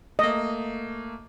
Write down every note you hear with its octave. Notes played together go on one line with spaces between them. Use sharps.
A3 A#3 D#5